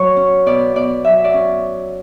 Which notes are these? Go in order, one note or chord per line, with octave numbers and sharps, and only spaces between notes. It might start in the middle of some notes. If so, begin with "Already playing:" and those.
Already playing: F#3 C#5
C#4
B2 D5
B2 D5
F#3 E5
D5
C#4